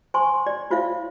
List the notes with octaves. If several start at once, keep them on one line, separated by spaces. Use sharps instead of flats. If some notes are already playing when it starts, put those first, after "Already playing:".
C5 G#5 C6 C#6
D5
E4 F4 C5 C#5 E5 F5